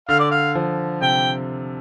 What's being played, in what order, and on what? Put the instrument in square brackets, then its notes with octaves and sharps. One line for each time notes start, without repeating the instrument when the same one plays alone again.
[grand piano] D3 [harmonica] F5
[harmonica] D5
F5
[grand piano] F3
[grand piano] C3 [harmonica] G5